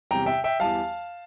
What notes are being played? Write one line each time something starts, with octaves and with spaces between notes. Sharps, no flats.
E2 C3 G3 G5 A#5
E5 G5
E5 G5
E2 E3 G3 F5 A5